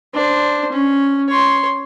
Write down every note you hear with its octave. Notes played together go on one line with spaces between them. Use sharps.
D4 C5
C#4
C#5 C6